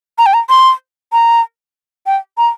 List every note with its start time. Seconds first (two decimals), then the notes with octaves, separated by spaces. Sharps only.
0.18 A#5
0.26 G5
0.34 A#5
0.50 C6
1.13 A#5
2.06 G5
2.38 A#5